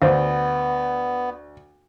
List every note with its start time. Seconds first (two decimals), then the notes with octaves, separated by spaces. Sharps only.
0.02 D2 B3 C5 F5